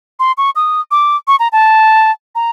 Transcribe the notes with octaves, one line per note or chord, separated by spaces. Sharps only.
C6
C#6
D#6
D6
C#6
A#5
A5
A#5